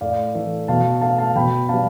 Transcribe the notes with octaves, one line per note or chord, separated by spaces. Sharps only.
A2 D5 F5
E3 A3
B2 F5 A5
A3 F5 A5
F5 A5
B2 G5 B5
G3 B3 F5 A5